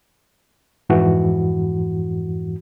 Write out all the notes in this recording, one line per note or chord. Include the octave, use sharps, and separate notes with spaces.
F2 G#2 E3 F#4